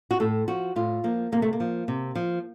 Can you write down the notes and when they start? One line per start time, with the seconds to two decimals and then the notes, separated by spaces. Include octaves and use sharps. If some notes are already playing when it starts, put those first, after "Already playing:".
0.11 F#4
0.20 A2 A4
0.48 F3 F#4
0.76 A2 F4
1.04 F3 A#3
1.32 C3 A#3
1.42 A3
1.53 A#3
1.60 F3
1.88 C3
2.15 F3